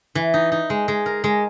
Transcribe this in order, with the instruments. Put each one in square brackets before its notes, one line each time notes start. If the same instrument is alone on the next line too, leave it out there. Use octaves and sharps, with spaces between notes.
[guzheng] E3
D#4
D#4
G#3
G#3
A#4
G#3